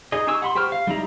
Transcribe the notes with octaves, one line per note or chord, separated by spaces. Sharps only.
D#4 G#4 D#5
D#4 G4 G#5 C#6 E6
F#5 B5 C6
G4 C5 G5 C#6 F6
F5
G3 D#4 E4 A#5